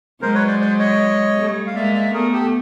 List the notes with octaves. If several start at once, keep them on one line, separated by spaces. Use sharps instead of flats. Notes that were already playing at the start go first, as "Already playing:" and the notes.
F#3 G#3 A#4 C5
B4 C#5
C5 D5
C5 D5
C#5 D#5
G3 A3
F5
G#3 A#3 D5 E5
D5 E5
A3 B3 G#4 A#4
G4 A4